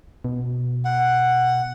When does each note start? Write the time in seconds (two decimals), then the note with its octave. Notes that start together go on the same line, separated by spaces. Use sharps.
0.25 B2
0.85 F#5